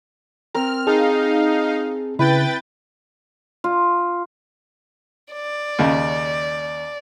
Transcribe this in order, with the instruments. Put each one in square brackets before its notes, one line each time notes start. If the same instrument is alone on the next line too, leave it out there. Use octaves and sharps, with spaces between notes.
[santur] C4 A#4 [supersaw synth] F6
[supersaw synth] D#4 F5 [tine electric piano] G#4 [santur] A5
[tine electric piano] C#3 [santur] E4 [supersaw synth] B4 G5 A6
[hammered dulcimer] F4
[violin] D5
[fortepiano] D#2 C#3